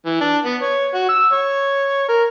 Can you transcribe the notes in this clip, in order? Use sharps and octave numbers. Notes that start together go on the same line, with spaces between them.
E3
D4
B3
C#5
F#4
E6
C#5
A#4